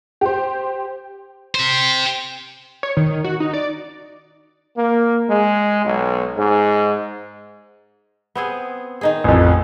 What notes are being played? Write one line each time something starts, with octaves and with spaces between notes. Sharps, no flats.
G4 C5
G4 C5
C#5
D#3
F#4
D#4
D5
A#3
G#3
B1
G#2
B3 C4 G#4
D#3 D#4 G#4
A1 F2